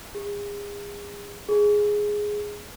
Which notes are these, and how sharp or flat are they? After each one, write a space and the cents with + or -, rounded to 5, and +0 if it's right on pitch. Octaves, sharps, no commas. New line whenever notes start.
G#4 -35
G#4 +0